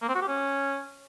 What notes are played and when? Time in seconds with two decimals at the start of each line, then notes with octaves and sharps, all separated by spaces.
0.02 A#3
0.09 C4
0.15 F#4
0.22 G4
0.28 C#4